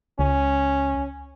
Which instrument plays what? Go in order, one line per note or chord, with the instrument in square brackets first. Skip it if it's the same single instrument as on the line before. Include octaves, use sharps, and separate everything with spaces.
[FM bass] C#2 [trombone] C#4